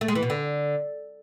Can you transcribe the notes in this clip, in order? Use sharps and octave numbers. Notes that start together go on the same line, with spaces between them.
A3
G#3
E3
B2
D3